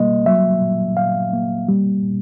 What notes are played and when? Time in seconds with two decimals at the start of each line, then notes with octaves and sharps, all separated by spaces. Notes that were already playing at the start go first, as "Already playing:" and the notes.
Already playing: C2 B2 G3 A#3 D#5
0.26 F#3 E5
0.61 A#2
0.97 A#2 F5
1.33 A#3
1.68 G3
2.03 A#2